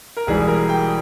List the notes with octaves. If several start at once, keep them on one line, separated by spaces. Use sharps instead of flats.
A#4
E1 E2 E3 G3 G#4
A#4
G5